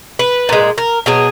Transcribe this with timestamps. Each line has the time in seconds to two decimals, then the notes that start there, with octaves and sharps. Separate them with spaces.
0.19 B4
0.49 A#2 G#3
0.78 A#4
1.06 B2 F#3 G#4